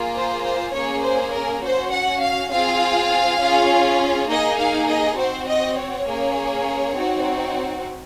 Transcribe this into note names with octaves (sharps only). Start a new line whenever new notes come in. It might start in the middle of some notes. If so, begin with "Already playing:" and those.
Already playing: A#3 F4 G#4
C5
C5
A#3 C#4 G#4 C#5
C5
A#4
C#4 F#4 C5
F#5
F5
C4 F4 G#4 F5
C#4 F4 G#4
A#3 D#4 G#4 D#5
F5
D#5
C4 F#4 C5
D#5
C#5
A#3 C#4 G#4
C4 D#4 F#4